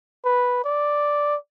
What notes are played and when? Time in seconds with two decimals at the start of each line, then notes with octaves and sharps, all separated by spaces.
0.25 B4
0.65 D5